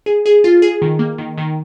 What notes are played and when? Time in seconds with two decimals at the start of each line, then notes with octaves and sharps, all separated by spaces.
0.06 G#4
0.26 G#4
0.44 F4
0.62 G#4
0.82 D#3
0.99 A#3
1.18 D#3
1.38 D#3